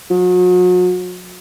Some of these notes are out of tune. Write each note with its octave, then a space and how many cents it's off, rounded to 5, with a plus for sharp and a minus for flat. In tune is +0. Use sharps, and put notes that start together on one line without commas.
F#3 -40